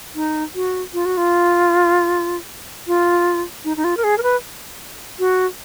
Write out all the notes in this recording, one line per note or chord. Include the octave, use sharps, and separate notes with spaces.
D#4
F#4
F4
F#4
F4
F4
D#4
D#4
F4
A#4
G#4
A#4
B4
F#4